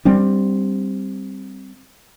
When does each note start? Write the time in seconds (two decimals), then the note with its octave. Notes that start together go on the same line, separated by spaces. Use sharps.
0.05 G3 C4 D4